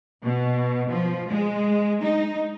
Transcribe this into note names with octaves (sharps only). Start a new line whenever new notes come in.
B2
F3
G#3
D#4